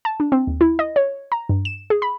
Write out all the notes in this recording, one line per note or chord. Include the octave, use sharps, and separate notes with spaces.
A5
D4
C4
D#2
E4
D#5
C#5
A#5
G2
E7
G#4
B5